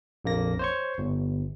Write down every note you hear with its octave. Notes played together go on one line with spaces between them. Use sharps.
A#1 F2 A#3 A#6
C5 C#5 C#6
G1